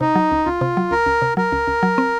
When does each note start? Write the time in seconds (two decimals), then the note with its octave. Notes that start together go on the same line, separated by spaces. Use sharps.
0.01 C3 D#4
0.15 F#3
0.31 C#2
0.46 C#2 F4
0.61 C3
0.77 F#3
0.91 C#2 A#4
1.06 C#2
1.22 C3
1.37 F#3 A#4
1.52 C#2
1.68 C#2
1.83 F#3
1.98 C4